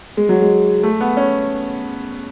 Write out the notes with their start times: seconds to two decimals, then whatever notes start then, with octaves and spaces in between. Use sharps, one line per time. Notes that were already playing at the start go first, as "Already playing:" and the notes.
0.17 G#3
0.29 F#3
0.41 G#3
0.83 A3
1.01 B3
1.17 C#4